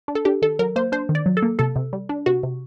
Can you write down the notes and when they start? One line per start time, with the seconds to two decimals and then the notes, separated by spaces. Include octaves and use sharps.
0.08 D4
0.15 A4
0.25 D4 G4
0.42 D#3 A4
0.59 F#3 A#4
0.76 A#3 C5
0.92 D4 C5
1.09 D#3
1.15 D5
1.26 F#3
1.37 A4
1.42 A#3
1.59 C3 A4
1.76 C3
1.93 G3
2.09 D4
2.26 C3 F#4
2.43 C3